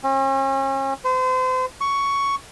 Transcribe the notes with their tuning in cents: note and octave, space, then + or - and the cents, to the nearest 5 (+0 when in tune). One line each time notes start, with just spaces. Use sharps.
C#4 -40
C5 -35
C#6 +10